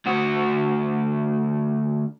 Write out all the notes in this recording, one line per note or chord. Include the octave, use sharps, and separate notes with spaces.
D2 F#4